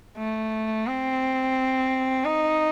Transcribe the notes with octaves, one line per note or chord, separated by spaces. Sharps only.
A3
C4
D#4